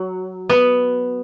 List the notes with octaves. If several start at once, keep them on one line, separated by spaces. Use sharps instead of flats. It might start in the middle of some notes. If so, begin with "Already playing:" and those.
Already playing: F#3
B3